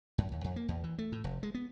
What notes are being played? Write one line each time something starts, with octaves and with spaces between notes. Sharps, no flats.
F#2
D#2
F2
A#3
E2
E3
A3
A2
F1
G#3
B3